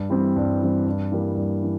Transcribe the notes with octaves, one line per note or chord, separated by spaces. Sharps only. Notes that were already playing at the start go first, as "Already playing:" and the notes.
Already playing: G2
E3 G3 C4
G2
E3 G3 C4
G2
E3 G3 A#3
G2
E3